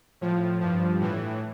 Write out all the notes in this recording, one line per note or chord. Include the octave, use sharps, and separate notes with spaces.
A2 F3
G2 F3
A2 E3